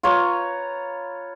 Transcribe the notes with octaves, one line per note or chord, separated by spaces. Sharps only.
F4 B4 C#5 A#5